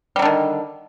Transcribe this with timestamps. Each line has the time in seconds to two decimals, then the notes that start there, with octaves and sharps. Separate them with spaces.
0.16 G3
0.19 F#3
0.22 D3
0.25 D#3